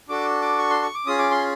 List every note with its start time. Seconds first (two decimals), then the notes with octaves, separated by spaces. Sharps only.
0.09 D4 F#4 A4 D6
0.42 D6
0.58 C#6
0.70 C6
0.82 C#6
0.95 D6
1.06 C#4 F4 G#4 D#6
1.19 D6
1.31 C6